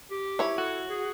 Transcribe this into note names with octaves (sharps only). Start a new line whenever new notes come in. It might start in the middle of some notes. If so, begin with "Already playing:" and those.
G4
E4 C#5
F#4 A4
G#4